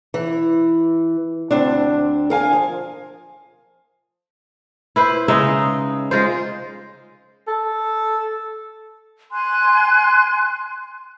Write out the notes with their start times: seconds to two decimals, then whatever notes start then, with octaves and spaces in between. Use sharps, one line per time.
0.14 E3
1.51 D2 C4 D4
2.30 A#4 F5 G#5
2.53 F3
4.96 E4 B4 C5
5.28 C#3 G#3 D#4 E5
6.11 G#3 F4 C5
7.48 A4
9.33 G#5 C6 F#6